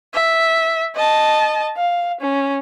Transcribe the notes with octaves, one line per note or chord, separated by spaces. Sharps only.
E5
D#5 A5
F5
C#4